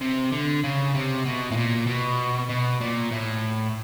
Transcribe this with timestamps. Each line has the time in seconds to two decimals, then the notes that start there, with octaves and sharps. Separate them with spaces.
0.01 C3
0.32 D3
0.64 C#3
0.94 C3
1.26 B2
1.52 A2
1.57 A#2
1.87 B2
2.49 B2
2.81 A#2
3.11 A2